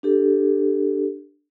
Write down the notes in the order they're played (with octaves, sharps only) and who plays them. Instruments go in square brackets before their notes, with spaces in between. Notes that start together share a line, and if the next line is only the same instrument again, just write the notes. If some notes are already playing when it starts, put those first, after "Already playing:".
[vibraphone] D4 G4 A4